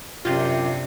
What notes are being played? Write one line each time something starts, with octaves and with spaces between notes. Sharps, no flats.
F#2 C3 D4 F4 G4